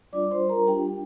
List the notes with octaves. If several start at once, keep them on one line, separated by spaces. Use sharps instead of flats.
G3 D4 F4 D5 D6
C5 C6
A#4 A#5
G3 D4 F4 G4 G5